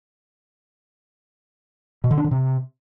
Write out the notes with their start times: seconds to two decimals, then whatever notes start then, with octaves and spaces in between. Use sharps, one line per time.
2.04 B2
2.11 D3
2.18 D4
2.24 D3
2.31 C3